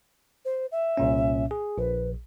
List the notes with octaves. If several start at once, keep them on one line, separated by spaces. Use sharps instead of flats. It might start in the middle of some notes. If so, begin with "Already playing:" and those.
C5
E5
C2 A#2 C#4
G#4
A#1 B4